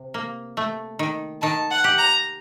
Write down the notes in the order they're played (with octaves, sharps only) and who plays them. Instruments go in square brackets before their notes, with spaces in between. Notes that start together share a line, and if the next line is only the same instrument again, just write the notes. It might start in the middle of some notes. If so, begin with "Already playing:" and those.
Already playing: [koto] C3
A#3
A3
D#3
[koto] D#3 [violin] A5
[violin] F#5
[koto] G4
[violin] A#5